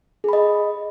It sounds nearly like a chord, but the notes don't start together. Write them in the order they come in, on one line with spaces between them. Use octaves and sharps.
G#4 B5 D#5